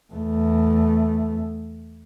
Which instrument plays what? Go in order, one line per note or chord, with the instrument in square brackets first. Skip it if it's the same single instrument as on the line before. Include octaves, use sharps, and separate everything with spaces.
[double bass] E2 A3